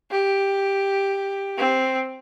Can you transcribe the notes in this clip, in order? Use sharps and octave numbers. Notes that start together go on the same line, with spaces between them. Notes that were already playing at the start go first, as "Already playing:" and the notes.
G4
C4